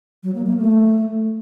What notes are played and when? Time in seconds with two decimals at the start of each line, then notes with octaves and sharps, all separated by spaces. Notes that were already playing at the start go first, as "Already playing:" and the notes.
0.23 F#3
0.35 A#3
0.46 A#3
0.57 A3